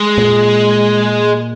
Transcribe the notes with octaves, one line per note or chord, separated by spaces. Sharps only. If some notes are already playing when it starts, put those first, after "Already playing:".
Already playing: G#3
A#2